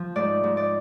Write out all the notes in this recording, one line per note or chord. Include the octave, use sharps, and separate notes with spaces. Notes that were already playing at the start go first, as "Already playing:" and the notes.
Already playing: F3
G#2 D5
G#2
D5